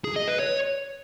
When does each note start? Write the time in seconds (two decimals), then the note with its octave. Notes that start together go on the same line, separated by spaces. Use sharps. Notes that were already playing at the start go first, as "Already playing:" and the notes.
0.04 G#4
0.16 D#5
0.28 B4
0.39 C#5